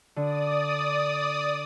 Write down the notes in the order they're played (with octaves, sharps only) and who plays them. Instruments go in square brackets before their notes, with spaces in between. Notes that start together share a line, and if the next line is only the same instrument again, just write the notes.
[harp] D3 [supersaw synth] D5 D#6